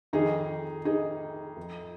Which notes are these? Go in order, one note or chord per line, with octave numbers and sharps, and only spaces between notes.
F2 D#3 D#4 G#4
D#4 G#4
F2 F3